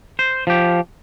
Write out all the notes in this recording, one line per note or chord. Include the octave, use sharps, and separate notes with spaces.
C5
F3 G4